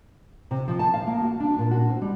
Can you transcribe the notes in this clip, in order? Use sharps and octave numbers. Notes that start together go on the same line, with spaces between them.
C3
F3
A5
F5
A#3
F#4
D4
A#2
F#4
C4
G3